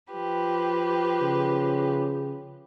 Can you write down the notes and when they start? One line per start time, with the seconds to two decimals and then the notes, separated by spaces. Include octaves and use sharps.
0.11 F3 G4 B4
1.21 C#3